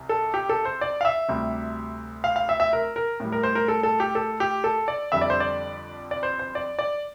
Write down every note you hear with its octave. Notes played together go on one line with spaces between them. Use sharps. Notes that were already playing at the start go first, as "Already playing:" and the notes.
Already playing: C2 C3
A4
G4
A4
C5
D5
F5
E5
D2 C3 G3
F5
F5
E5
E5
A#4
A#4
A2 G3
A#4
C5
A#4
A4
A4
G4
A4
G4
A4
D5
F2 D3 G3 E5
D5
C5
D5
D5
C5
C5
D5
D5